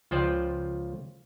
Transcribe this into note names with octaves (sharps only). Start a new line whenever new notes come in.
C#2 F3 F4 C5 D5 G5